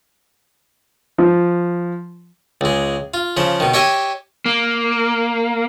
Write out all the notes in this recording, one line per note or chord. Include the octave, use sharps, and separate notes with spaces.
F3
C#2 G#3
F4
C#3 F3 C5
B2 D#3
G4 C#5 D#5 E5 G#5
A#3